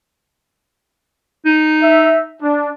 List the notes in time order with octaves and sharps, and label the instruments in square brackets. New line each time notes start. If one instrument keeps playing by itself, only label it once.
[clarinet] D#4
[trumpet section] E5
D4